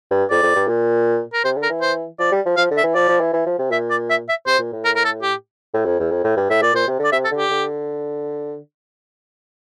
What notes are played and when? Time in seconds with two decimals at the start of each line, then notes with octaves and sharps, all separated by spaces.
0.11 G2
0.30 F2 D5
0.43 F2
0.56 G2
0.68 A#2
1.33 A#4
1.44 C3 C5
1.57 D3
1.63 A#4
1.70 E3
1.81 C5
2.19 F3 D5
2.32 G3
2.46 F3
2.57 F3 F5
2.71 D3
2.77 E5
2.84 E3
2.95 F3 D5
3.09 F3
3.20 E3
3.34 E3
3.46 F3
3.59 C3
3.71 A#2 E5
3.90 D5
4.10 E5
4.29 E5
4.47 C3 C5
4.59 A#2
4.73 A2
4.85 A#4
4.96 A#4
5.05 A4
5.22 G4
5.74 A2
5.86 F2
5.99 E2
6.11 F2
6.24 A2
6.37 G2
6.50 A2 E5
6.62 A#2 D5
6.74 A#2 C5
6.88 C3
6.99 D3
7.04 D5
7.12 C3 E5
7.25 A4
7.32 D3
7.37 G4
7.51 D3